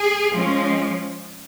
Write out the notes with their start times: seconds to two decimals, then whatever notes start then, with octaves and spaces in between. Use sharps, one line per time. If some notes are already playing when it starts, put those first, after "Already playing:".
Already playing: G#4
0.34 F3 G#3 C#4